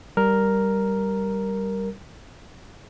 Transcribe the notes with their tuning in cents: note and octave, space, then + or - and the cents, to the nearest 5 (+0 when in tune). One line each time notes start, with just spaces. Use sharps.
G3 -10 A#4 +0